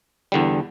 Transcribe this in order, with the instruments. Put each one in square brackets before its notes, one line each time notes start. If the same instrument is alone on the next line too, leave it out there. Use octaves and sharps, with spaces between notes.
[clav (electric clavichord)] E2 D3 G3